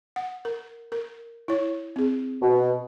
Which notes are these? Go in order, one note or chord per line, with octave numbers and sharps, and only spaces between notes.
F#5
A#4
A#4
E4 C#5
C4 G#4
B2